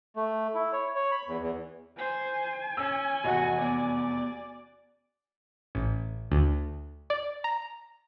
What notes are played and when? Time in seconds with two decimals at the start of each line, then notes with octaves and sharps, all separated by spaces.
0.16 A3
0.55 E4
0.73 C#5
0.95 C#5
1.12 B5
1.28 E2
1.42 E2
1.98 C5 G#5
2.77 C#4 E6
3.24 F1 E2 F#4 D#5 F#5
3.60 B3 D5
5.75 A1
6.32 D2
7.10 D5
7.44 A#5